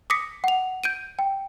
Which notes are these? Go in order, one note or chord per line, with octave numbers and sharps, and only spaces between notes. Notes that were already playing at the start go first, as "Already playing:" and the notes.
D6 D#6 A#6 B6 C#7
F#5 F7
G6 D7 D#7
G5